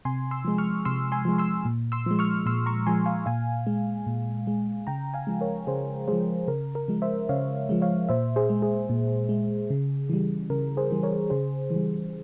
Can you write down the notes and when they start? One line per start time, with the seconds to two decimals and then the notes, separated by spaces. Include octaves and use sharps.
0.05 C3 G#5 C6
0.31 C6 E6
0.45 F3 G#3
0.58 C#6 F6
0.85 C3 C6 E6
1.12 G#5 C6
1.25 F3 G#3
1.38 C6 E6
1.65 A#2
1.92 C6 E6
2.06 F3 G#3
2.19 C#6 F6
2.46 A#2 C6 E6
2.66 A#5 C#6
2.87 F3 G#3 G#5 C6
3.06 F5 G#5
3.26 A#2 F5 G#5
3.67 G#3
4.07 A#2
4.47 G#3
4.87 C#3 G5 A#5
5.14 F5 G#5
5.27 F3 G#3
5.41 A#4 C#5
5.67 C#3 G#4 C5
6.08 F3 G#3 G#4 C5
6.48 C#3 A#4
6.75 A#4
6.88 F3 G#3
7.02 C5 E5
7.29 C#3 C#5 F5
7.69 F3 G#3
7.82 C#5 F5
8.09 A#2 C5 E5
8.36 G#4 C5
8.50 G#3
8.62 G#4
8.89 A#2
9.29 G#3
9.70 C#3
10.10 E3 G3
10.50 C#3 A#4
10.77 G#4 C5
10.91 E3 G3
11.03 A#4 C#5
11.30 C#3 G#4 C5
11.70 E3
11.75 G3